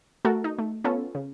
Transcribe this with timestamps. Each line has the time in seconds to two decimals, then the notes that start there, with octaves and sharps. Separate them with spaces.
0.25 A3 F#4 A4 A#4
0.44 D#4
0.58 A3
0.84 B3 C#4 F4 A4
1.15 C#3